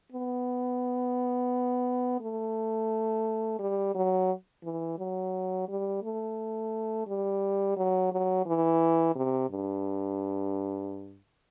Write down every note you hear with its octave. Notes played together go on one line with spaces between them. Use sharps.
B3
A3
G3
F#3
E3
F#3
G3
A3
G3
F#3
F#3
E3
C3
G2